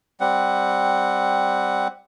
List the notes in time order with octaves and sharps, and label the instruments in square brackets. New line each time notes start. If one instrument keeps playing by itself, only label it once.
[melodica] G3 C4 F#5